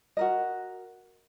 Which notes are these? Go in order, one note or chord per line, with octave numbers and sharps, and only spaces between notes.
F#4 A#4 D#5